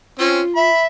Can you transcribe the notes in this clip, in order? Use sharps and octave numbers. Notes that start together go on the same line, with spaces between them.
C4 C#4 F4
E5 B5